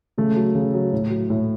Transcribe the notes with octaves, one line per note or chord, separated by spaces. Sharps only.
C#3 A3
F#3
C#3
F#3
A2
F#3
A2